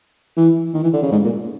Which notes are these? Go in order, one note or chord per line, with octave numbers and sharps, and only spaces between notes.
E3
D#3
E3
D3
C#3
G#2
A#2